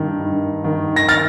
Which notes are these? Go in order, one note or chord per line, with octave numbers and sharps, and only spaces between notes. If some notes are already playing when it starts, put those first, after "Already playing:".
Already playing: G2 D#3
G2
D#3
A#6
F6 A6